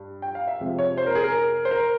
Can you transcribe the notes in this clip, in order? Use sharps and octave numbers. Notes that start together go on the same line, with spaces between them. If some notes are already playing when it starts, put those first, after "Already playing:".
Already playing: G2
G5
F5
E5
F2 C3 F3 G#3
C#5
C5
A#4
G#4
A#4
C5
A#4